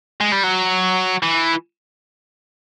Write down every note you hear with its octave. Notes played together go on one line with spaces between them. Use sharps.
G#3
G3
F#3
E3